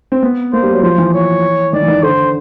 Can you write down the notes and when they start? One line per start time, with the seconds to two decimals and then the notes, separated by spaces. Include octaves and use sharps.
0.12 C4
0.23 B3
0.52 A#3 C5
0.63 G3
0.73 F#3
0.83 F3 C5
0.98 E3
1.14 C#5
1.73 D#3 D5
1.82 E3
1.88 D#3
2.03 D3 C5